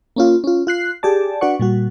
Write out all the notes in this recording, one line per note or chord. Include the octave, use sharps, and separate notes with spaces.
A#3 C#4 F4
C#4 F4
F4 F#6 C7
G4 G#4 D5 A5
D4 F#4 B4 D5 F#5 C#6
A#2 G3 F#4